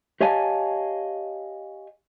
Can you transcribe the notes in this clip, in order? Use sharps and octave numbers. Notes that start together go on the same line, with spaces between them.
G4 C#5 D#5 F5 G#5 A5